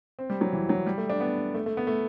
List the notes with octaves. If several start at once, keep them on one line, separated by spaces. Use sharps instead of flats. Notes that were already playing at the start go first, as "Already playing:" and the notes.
C4
G3
F#3
E3
F#3
G3
A3
D4
B3
A3
A3
B3
A3